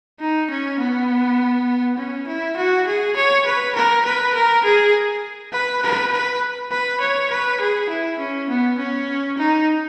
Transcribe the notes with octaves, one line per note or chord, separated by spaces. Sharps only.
D#4
C#4
B3
C#4
E4
F#4
G#4
C#5
B4
A#4
B4
A#4
G#4
B4
B4
B4
B4
C#5
B4
G#4
E4
C#4
B3
C#4
D#4